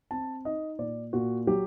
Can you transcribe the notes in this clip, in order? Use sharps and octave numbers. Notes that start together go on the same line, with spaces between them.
C4 A5
D#4 D#5
A#2 D5
A#2 F#4
F#3 G4